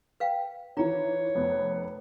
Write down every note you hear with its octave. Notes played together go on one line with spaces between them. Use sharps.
B4 F5 G5
D#3 E3 F4 C#5 A#5
F1 B3